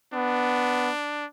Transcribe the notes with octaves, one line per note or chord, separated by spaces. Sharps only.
B3 D4